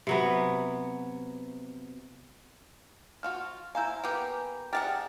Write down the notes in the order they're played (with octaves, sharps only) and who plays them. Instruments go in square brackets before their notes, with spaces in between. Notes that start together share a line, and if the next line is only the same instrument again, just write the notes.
[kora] C3 F#3 B3
[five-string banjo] F3 F4 F#4 [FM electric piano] F6
[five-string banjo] E4 C5 F5 [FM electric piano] G#5 A#5 G6
[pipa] A#3 B3 [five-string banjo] G4 A#4
[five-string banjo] D4 G#4 [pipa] G4 F5 F#5 [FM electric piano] A#5 F6 A6